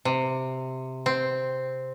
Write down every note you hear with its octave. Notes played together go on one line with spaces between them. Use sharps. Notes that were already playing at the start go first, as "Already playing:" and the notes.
C3
C4